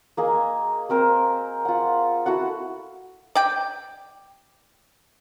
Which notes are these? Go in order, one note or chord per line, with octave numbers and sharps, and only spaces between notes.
A#3 G#4 D#5 G#5
A#3 C4 A#4 C5
F4 F#5
E4 F#4 A4 F#5
D5 G5